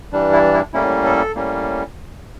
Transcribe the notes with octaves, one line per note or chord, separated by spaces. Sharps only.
G2 E3 G3 D4
E4
E4
A2 G3 A#3 C#4 E4
A4
A2 G3 A#3 C#4